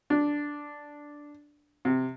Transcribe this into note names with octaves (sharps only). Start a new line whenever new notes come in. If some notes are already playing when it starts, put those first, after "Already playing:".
D4
C3